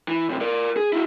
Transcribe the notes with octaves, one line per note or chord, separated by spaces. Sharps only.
E3
F#2 C3
A#4 D5
G#4
E4 F#4